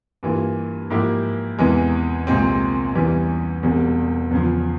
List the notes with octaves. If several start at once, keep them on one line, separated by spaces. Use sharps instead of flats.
G2 E3 A#3 F4
G#2 F3 A#3 E4 G4
E2 C3 E3 G#3
C2 A#2 G#3 C4
E2 E3 G3 C#4
E1 E2 C3 G3
E2 C#3 F3